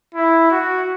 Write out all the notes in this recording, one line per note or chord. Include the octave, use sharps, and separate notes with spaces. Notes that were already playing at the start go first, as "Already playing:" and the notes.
E4
F#4